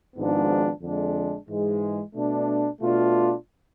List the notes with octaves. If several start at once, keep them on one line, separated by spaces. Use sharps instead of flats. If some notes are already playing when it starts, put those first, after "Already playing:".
G#1 G#2 F3 B3 D4
F2 D3 G#3 D4
G#2 E3 G#3
B2 A3 D4
B2 A3 D4 F4